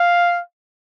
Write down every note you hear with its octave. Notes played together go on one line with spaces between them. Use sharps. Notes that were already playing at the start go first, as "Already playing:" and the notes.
Already playing: F5